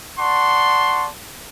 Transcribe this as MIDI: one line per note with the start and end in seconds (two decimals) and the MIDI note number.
0.19 1.07 74
0.19 1.07 78
0.19 1.07 81
0.19 1.07 84
0.19 1.07 85